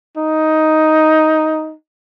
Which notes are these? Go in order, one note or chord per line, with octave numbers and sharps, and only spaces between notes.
D#4